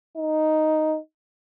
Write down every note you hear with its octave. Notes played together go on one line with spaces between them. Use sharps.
D#4